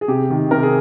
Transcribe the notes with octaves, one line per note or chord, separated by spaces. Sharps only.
G#4
C3 G4
D#3
C3 A#4
G#4